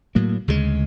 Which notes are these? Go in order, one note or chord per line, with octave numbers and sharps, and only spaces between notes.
A2 F#3 A#3
D2 C#3 F3 G#3